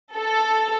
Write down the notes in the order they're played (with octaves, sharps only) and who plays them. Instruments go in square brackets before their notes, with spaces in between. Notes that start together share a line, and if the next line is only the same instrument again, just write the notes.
[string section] A4